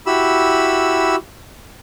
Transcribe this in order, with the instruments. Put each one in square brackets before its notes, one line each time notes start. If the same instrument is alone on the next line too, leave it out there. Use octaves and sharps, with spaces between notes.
[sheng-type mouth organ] E4 F#4 G4 B5 E6